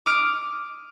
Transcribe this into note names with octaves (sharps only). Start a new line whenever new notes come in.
D6 D#6 F6 D7